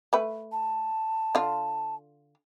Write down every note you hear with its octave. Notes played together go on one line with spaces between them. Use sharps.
A3 B4
A5
D3 F4